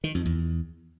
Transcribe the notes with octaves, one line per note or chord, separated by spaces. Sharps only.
D#3
F2
E2